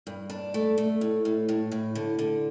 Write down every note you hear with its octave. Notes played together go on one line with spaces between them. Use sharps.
G2
D4
A3
A3
A2
A2
A2
A2
D3
D3